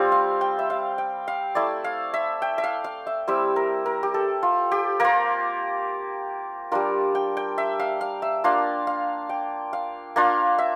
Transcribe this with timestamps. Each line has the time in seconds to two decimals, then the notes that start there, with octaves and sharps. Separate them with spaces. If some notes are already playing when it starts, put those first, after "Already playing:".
Already playing: G3 C4 F4
0.12 F5
0.41 G5
0.59 E5
0.70 F5
0.98 G5
1.28 F5
1.55 A3 E4 D5
1.84 F5
2.14 E5
2.42 G5
2.58 E5
2.64 F5
2.84 F5
3.07 E5
3.28 G3 C4 E4 E5
3.56 A#4
3.86 A#4
4.03 G4
4.14 A4
4.43 F4
4.72 G4
5.00 A#3 F4 A#4
6.72 G3 D4 F4 A#4
7.15 G5
7.37 G5
7.58 E5
7.80 F5
8.01 F5
8.22 E5
8.44 A#3 D4 F4 F5
8.87 F5
9.29 G5
9.73 F5
10.16 A#3 D4 F4 F5
10.59 E5